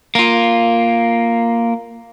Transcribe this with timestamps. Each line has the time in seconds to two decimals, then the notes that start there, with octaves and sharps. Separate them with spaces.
0.15 A#3 F4